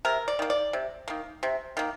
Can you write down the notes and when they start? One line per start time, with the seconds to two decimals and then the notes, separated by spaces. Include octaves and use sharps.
0.05 C3 A#4
0.28 D5
0.39 D#3 A#3
0.50 D5
0.73 C3
1.08 D#3 A#3
1.43 C3
1.77 D#3 A#3